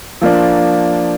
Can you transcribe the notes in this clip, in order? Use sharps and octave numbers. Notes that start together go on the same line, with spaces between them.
F3 A#3 D4